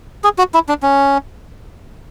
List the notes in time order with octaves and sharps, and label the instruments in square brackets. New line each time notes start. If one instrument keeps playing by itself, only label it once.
[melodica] G#4
F#4
E4
D4
C#4